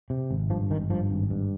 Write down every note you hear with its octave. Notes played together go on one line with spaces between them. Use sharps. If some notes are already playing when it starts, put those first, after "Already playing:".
C3
G#1
G2 F3
G#1 D#3
G2 F3
G#1
G2